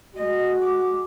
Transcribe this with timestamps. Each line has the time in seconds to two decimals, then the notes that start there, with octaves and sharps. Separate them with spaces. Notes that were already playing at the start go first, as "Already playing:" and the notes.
0.16 G#3 F#4 D#5
0.61 D6